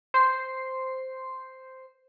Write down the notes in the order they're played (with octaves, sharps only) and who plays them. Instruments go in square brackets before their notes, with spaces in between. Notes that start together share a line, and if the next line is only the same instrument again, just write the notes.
[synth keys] C5 C7